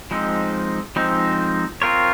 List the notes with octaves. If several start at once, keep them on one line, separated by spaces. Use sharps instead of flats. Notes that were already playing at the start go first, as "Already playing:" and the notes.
F3 G#3 C4 D#4
F3 G#3 C4 D#4
C4 F4 A#4 C#5